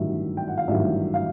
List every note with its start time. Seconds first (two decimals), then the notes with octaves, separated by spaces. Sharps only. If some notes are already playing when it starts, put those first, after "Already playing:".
Already playing: A1 G2 D#3 F#3 E5
0.37 G5
0.48 F#5
0.58 F5
0.68 A1 G2 D#3 F#3 E5
1.14 F5